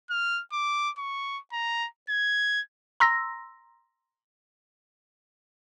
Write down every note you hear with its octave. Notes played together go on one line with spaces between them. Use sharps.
F6
D6
C#6
A#5
G#6
A#5 C6 E6 A#6